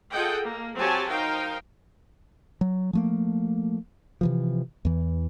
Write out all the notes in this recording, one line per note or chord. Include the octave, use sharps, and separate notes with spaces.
F4 G#4 A4 D#5 F#5 G5
A#3
F#3 C4 G4 C#5 G#5 A5
D#4 A#4 C5 F5 G5
F#3
F3 A3 A#3
C3 E3 F3
E2 E3